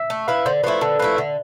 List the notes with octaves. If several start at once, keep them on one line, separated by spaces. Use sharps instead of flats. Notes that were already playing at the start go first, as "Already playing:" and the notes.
Already playing: E5
A3
E4 B4 F5
D3 C5
F3 A3 E4 B4
D3 A4
F3 A3 E4 B4
D3 E5